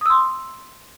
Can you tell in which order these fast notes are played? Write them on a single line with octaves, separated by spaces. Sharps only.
D#6 E6 C6